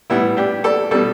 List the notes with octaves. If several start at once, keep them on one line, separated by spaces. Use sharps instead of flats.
A2 E3 G3 B3 E4
D4 G4
A4 D5
B2 G3 A4 D5